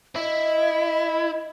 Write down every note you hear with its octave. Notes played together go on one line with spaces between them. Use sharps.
E4 D#5